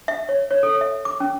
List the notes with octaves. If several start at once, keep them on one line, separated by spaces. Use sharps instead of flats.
E5
C#5
C#5
A4
E5
D6
C#4